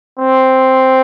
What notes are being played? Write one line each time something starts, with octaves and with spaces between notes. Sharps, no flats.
C4